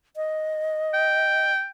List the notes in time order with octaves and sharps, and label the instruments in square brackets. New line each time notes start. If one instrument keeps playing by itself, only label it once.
[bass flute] D#5
[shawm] G5